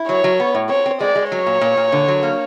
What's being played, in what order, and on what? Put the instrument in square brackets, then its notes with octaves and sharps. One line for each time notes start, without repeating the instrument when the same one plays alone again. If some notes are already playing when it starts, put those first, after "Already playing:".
Already playing: [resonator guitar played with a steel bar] E4
[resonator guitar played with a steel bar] F#3 [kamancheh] C#5
[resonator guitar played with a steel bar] F#3
B3
A2
[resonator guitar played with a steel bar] C4 [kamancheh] C#5
[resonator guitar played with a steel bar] C4
[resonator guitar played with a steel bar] G#3 [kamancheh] D5
[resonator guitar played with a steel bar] G#3
[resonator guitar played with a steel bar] F#3 [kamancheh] C#5
[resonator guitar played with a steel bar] A#2
A#2
A#2
D3
F#3
A#3